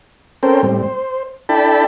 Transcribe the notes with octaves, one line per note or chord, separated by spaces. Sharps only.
C4 C#4 A4 A#4 C5 G5
A2 G3 C4
C5
D4 E4 A4 G5 A5 B5